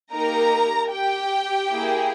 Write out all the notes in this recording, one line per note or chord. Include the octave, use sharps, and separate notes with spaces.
A#3 D#4 G4 A#4 A#5
G4 G5
A#3 E4 G#4